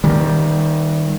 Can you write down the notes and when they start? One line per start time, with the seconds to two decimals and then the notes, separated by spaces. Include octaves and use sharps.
0.04 D#3 G3